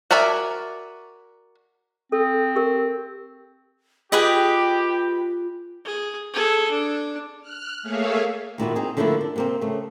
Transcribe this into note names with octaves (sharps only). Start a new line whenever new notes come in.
F#4 A#4 D5 E5 G#5
C4 A4
G4 A#4
F4 G4 G#4 B4 D#5
G#4
G#4 A4
D4
F6 F#6
A3 A#3 G#4 C#5 E5 F5
D#2 A#2 E4 F#4
C4 D#4 G#4
D3 F3 A3 A#3 D4 E4
D4
C3 A#3 C4
C#3 A3